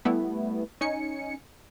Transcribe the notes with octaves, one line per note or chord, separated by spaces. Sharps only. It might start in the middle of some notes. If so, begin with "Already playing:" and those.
G3 A3 B3 E4
C#4 D#4 G#5 C#7